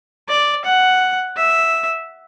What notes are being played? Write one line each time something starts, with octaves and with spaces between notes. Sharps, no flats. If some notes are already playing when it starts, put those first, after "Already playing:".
D5
F#5
E5